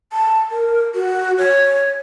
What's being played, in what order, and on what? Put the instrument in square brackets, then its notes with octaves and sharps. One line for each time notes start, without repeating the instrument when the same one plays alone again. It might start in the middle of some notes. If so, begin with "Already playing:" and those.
[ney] A5
A#4
F#4
C#5